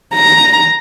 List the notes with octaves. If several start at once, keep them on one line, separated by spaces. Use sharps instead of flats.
A#5